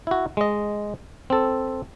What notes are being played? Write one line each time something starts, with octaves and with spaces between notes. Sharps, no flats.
E4 F#4
G#3 D#5
C4 A4